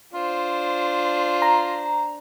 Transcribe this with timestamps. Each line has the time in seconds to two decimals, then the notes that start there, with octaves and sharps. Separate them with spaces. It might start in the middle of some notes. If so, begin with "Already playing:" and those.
0.14 D4 F4 C5
1.42 A#5